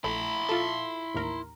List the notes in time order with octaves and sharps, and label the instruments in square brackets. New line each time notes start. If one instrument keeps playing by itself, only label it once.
[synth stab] A#1 A3 [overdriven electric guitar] E4 [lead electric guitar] B5 C6
[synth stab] F4 A4
A1 D#2 A#4